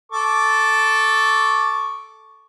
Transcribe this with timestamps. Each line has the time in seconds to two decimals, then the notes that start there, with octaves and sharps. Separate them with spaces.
0.12 A4 C#6 D6